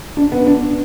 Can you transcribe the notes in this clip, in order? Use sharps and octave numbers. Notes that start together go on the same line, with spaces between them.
D4
B3
D4